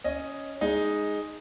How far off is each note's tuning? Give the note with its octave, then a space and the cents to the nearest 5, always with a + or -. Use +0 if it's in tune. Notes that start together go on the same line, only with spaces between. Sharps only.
C#4 +0 D#5 +0
G#3 +0 D#4 +0